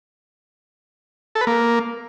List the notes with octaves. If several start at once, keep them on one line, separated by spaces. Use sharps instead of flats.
A4
B4
A#3